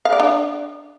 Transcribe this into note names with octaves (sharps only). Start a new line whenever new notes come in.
F5
D5
D4